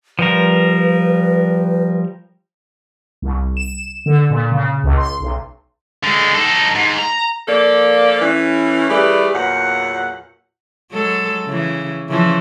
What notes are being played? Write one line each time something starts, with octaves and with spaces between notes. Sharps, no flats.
F3 G3 A#4 B4
C2
E7
D3
A#2
C#3
C#2
C6
B1
D3 G#3
D#4 A4
G#2
A#5
F3 A#3 A4 D5
E3 A3 C#4
E3 G3 A3 G#4 B4 D5
E2 A#2 F#3 F#5
F#3 G#3 A4
C#3 E3
C#3 E3 F3